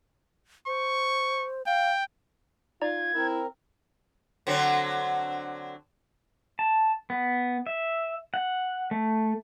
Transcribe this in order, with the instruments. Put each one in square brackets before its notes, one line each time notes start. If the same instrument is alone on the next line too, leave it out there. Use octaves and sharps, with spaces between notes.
[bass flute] C5 [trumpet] C#6
[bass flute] F5 [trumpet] G5
[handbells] D#4 D5 A#5 [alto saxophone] F4 [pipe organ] G#6
[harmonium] C4 A#4 [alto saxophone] E4
[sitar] D3 F#3 C4
[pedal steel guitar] A5
B3
E5
F#5
A3